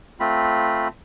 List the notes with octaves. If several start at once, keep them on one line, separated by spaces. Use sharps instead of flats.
A3 C4 F4 B5